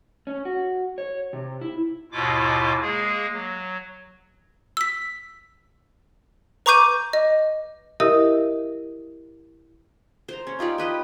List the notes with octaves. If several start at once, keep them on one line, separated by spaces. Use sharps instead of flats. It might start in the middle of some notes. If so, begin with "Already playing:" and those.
C#4
F#4
C#5
C3
E4
D#2 G#2 B2 E4 F4 D6
G#3 A#3 G#4
F#3
E6 B6
B4 A#5 C#6 D6 G6 D#7
D#5
E4 G4 A#4 D#5 E5 D#6
C5 A#5
C#4
D#4 F4 G4 D5
G4 B4 D#5